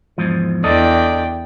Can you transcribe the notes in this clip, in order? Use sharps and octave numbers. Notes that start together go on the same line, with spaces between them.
E2 G#2 F3
E2 D4 A4 D5 D#5 G5